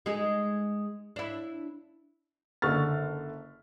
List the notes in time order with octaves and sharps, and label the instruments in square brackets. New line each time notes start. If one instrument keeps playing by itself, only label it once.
[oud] G#3 D#4 G#4
D4 E4
[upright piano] F#1 D3 C#6 F6 A6